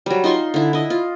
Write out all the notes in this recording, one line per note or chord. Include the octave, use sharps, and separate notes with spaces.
F#3 G3
D#4 F4 C6 C#6
D3 E4
E4 D#5
F4